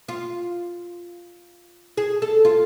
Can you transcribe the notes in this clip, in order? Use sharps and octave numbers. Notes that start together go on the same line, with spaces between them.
F4
G#4
A4
F4